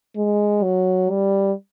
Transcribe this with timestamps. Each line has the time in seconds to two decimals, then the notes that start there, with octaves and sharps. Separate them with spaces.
0.16 G#3
0.63 F#3
1.10 G3